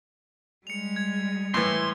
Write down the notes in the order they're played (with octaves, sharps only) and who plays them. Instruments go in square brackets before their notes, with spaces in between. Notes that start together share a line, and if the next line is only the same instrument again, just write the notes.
[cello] G3 G#3 [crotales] C#7 F7
[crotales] G#6
[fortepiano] A2 E3 [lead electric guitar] C6